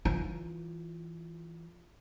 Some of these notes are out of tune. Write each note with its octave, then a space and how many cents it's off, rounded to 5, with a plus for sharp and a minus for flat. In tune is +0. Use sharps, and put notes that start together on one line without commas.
E3 +0 F4 +0